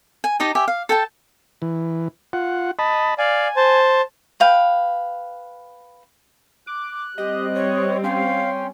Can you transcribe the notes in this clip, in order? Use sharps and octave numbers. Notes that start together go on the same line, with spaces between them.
G#5
D#4 G4 D#5 A5
G4 E5 G#5
F5
A4 G5 A5
E3
F4 F#5
D#5 A5 B5
D5 F5 G#5
C5 A5
B4 F5 G5
D6 F#6
G3 C4 G4 D#5
C#5
C#4 F5 G5 C6